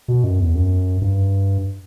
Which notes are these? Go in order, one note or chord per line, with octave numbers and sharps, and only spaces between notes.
B2
F#2
E2
F#2
G2